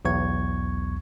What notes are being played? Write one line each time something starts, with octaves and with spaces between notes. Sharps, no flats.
B1 E2 C#6 G#6